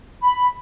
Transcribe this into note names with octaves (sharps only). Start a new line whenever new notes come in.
B5